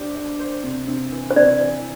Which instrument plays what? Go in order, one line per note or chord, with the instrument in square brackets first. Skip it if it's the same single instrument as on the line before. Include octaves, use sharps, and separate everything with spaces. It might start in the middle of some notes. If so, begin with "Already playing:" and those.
Already playing: [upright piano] D4 G4 C5
D4
C5
C3
C3
E3
[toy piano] C5
[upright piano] C3 [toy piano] D5
[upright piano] E3